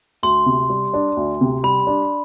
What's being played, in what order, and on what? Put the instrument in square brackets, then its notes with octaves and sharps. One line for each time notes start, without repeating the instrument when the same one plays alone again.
[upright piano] D2 [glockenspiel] C6
[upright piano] C3
G3
D4
D2
C3
[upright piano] G3 [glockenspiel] B5
[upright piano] D4